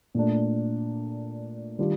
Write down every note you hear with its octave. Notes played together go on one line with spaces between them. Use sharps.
A#2 A3 D4
D#3 G3 D4 F4